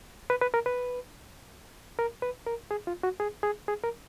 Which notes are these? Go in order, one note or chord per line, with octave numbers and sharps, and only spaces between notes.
B4
B4
A#4
B4
A#4
B4
A#4
G#4
F4
F#4
G#4
G#4
G#4
A#4